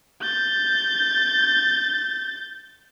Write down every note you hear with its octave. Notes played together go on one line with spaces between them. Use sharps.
G6 A6